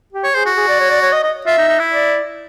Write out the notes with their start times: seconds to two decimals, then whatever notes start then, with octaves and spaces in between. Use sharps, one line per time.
0.12 G4
0.24 C#5
0.34 G#4 C5
0.46 F#4
0.57 G#4
0.68 D5
0.80 C#5
0.90 D5
1.02 C#5
1.12 D#5
1.23 D#5
1.47 F4 E5
1.58 D#4
1.68 D#4
1.79 E4
1.91 D5